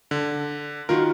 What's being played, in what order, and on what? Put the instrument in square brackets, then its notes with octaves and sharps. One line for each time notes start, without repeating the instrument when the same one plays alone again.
[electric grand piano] D3
[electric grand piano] D#3 A#4 [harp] F4 F#4